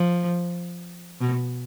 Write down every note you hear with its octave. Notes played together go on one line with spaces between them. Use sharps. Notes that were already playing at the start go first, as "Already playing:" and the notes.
Already playing: F3
B2